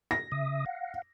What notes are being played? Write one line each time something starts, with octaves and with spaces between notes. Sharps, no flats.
A#6
C#3 E5 D#6
F5 F#5